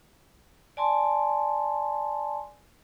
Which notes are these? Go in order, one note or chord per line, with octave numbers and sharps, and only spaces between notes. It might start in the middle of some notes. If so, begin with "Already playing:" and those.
D5 G#5 A5 C6